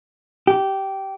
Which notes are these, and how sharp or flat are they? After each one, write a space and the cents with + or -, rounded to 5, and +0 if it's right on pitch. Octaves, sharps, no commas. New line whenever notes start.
G4 -15